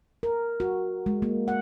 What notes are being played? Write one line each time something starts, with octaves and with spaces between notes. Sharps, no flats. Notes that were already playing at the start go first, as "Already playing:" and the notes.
A#4
F#4
G#3
A#3
F#5